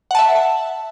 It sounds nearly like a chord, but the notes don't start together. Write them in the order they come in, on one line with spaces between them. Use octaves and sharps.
F#5 A5 E5